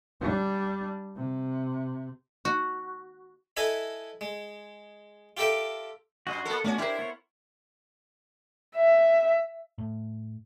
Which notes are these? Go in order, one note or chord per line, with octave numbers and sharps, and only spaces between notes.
G3 D4
C3
F#4
E4 A4 B4 D#5 G#5 B5
G#3
F4 G4 A4 A#4 E5 G5
F#2 F#4 D#5 C6
A#3 A4
A3 B3 C#4 D4 F#4
D4 E4 G4 A#4 C5
B3 C5 C#5
E5
A2